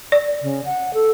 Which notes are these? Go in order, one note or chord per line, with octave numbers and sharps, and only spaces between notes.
D5
C#3
F#5
A4